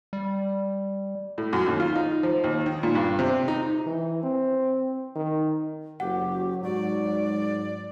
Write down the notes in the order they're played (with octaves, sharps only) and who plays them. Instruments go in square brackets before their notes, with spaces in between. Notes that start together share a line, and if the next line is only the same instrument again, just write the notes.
[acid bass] G3
[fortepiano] A2
F#2
D#2
F4
D#4
F3
D#2
D#3
A#2
G2
C3
D#4
[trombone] E3
C4
D#3
[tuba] F#1 [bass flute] F#3 [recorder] G4 [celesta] F#5
[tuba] G#2 [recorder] D5